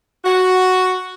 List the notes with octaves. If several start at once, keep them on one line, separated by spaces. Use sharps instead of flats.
F#4